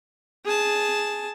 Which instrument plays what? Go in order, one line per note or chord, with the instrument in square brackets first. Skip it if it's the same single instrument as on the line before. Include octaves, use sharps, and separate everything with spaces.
[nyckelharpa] G#4 A5